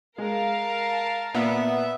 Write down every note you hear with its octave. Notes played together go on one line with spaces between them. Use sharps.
G#3 A#4 F5 A5
A#2 B3 E5